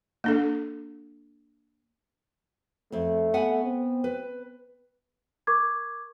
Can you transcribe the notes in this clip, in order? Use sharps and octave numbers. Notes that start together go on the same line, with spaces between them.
A#3 D4 A4
F2 A3 C4
B3 F#5 G#5
C4
B4
A#4 C#6 D6 G#6